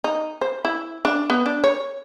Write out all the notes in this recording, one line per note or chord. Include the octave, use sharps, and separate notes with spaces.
D#4
C5
E4
D4
B3
D4
C#5